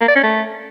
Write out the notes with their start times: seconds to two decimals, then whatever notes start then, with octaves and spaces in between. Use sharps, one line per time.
0.01 A#3
0.08 D5
0.16 C#4
0.23 A3